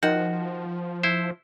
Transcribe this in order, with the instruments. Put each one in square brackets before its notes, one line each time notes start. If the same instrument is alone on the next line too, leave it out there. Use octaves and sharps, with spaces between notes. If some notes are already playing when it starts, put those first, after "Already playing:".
[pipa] D#3 D#4 F#5 [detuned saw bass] F3 [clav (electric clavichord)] F#4
[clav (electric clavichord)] E4 C5